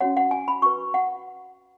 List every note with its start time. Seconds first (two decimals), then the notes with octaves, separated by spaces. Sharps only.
0.01 C#4 F#4 C#5 F#5
0.17 F#5
0.31 G#5
0.48 B5
0.62 F#4 C#6
0.66 B4
0.94 F#5